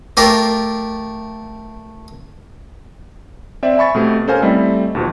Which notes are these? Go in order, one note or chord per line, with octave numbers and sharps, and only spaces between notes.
A3 F4 G4 A#4
C4 D5 E5
E5 G#5 B5 C#6 A6
B2 A3 C4 G4
C#4 A4 A#4 C5 F5 G#5
G3 A3 C4 E4 D#5
D#2 B2 F3